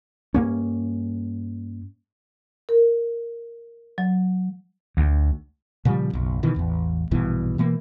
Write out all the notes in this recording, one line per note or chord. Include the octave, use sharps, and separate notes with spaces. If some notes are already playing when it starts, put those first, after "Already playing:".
G2 A#3 C#4
A#4
F#3
D2
A#2 C#3 F3 G3
F#1 B1
B2 D#3 E3
A1 E2
A#1 G2 B2 E3
B2 E3 A3 A#3